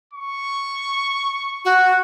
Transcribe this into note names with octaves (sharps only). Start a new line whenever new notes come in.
C#6
F#4